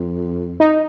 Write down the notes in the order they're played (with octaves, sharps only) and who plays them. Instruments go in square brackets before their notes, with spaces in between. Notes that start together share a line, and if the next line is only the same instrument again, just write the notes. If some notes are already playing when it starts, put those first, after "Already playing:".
Already playing: [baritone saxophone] F2
[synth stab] D#4